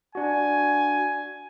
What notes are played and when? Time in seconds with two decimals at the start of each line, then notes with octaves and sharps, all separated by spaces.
0.15 D4 F#4 G#5